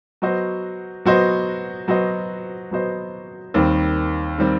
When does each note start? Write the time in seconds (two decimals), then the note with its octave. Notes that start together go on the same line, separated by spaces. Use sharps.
0.22 F#3 B3 F#4 C5 D#5
1.05 F#3 B3 F#4 C5 D#5
1.88 F#3 B3 F#4 C5 D#5
2.71 F#3 B3 F#4 C5 D#5
3.54 D#2 D#3 G3 C4
4.38 D#3 G3 C4